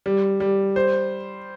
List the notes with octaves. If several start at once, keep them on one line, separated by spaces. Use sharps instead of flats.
G3
G3
C5